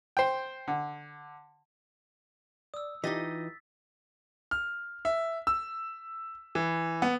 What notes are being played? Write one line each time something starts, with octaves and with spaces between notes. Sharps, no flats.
C5 G5
D3
D5 D#6 E6
E3 D#4 F4 G4 D#5 A6 B6
F6
E5
E6
E3
B3